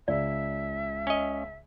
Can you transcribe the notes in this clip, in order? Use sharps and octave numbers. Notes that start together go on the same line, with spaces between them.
C#2 D5 E5
C#4 D#5